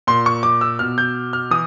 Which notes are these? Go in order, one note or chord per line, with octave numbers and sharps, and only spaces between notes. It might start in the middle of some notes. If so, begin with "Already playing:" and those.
A#2 C6
C#6
D6
E6
B2 F6
G6
F6
E3 D#6